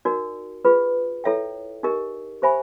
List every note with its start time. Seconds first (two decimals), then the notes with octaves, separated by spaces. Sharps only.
0.05 D#4 F#4 A#4 D5
0.65 F4 G#4 B4
1.24 E4 A4 C#5 E5 G5
1.83 D#4 G4 A#4 D#5
2.42 G4 C5 E5 G#5 B5